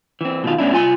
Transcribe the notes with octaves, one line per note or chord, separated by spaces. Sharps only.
E3 C4
B2 D#3 F4
A2 B3 C#4 D4 E4
C2 F4 G#5 C6